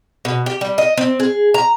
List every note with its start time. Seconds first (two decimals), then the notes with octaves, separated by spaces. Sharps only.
0.25 B2
0.46 G4
0.61 G3
0.78 D#5
0.97 C4
1.20 G#4
1.54 A#5